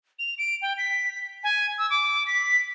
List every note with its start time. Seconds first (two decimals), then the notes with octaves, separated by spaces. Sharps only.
0.19 F7
0.38 D7
0.62 G5
0.78 B6
1.44 G#5
1.78 E6
1.90 D6
2.27 B6